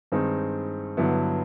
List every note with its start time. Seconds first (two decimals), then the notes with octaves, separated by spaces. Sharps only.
0.12 G2 D#3 G#3 C4 D#4
0.97 G2 D3 F#3 B3 E4